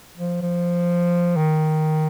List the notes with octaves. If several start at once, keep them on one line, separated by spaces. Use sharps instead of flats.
F3
F3
D#3